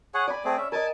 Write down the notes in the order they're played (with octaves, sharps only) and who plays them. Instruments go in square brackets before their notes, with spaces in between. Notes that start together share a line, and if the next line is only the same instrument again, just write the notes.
[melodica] G#4 C#5 F#5
[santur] D5 B5 [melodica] G#5
[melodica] A3 C4 G#4
C#4 E5
[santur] A#4 D#5 [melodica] G#5 A5